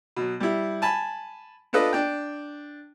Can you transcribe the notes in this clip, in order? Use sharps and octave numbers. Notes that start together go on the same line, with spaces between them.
B2 F#3
G3 E4
G#5 A5 B5
D4 F4 A4 B4 D#5
D4 G5